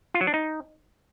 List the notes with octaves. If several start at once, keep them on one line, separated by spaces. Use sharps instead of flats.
F4
F#3
D4
D#4